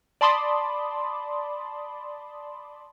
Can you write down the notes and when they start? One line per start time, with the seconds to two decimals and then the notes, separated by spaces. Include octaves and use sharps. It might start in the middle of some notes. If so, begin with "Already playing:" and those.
0.21 D5 A5 B5 C6 D6 D#6